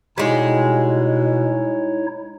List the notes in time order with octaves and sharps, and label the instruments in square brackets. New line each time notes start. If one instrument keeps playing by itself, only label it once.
[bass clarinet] B2 [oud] G3 G#3 [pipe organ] D#4 E4 C#5